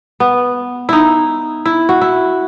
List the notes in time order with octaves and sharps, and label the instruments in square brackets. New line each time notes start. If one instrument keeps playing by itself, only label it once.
[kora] B3
D#4 E4
E4
F#4
E4